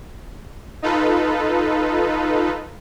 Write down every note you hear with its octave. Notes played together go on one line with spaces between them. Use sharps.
D#4 F4 A4 B4